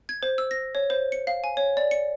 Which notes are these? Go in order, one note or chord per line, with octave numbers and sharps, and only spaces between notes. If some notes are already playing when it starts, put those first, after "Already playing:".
G#6
C5
E6
A#6
C#5
C5
C#7
F5
G#5
C#5
D5
C#7